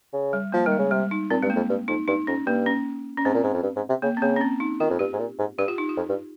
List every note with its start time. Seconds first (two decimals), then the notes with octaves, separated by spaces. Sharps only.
0.13 C#3
0.33 G3
0.52 F3 A#3
0.66 D#3 G3
0.72 G#3
0.79 C#3
0.91 C3 G3
1.11 D#4
1.30 A#2 C4
1.43 G2 G#3
1.50 A#3
1.56 F2
1.69 G2
1.88 F2 D#4
2.08 G2 D#4
2.27 F2 C#4
2.47 G2 A#3
2.66 C#4
3.17 C#4
3.25 G#2 C4
3.34 A#2
3.44 G#2
3.54 F2
3.63 G2
3.76 G#2
3.89 C3
4.02 C#3 A#3
4.17 C4
4.22 C#3 A#3
4.36 C#4
4.41 C4
4.60 D#4
4.80 D#3 F4
4.90 F2
4.99 G2 G4
5.13 G#2
5.19 A#2
5.39 G#2
5.58 G2 G4
5.68 F4
5.78 D#4
5.89 F4
5.97 F2
6.09 G2